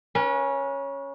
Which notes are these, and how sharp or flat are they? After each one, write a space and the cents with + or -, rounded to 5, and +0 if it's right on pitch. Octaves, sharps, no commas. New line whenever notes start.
C#4 +0 B4 -45